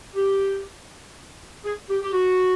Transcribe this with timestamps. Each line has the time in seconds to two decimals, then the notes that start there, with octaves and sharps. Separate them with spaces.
0.15 G4
1.64 G#4
1.88 G4
2.01 G4
2.13 F#4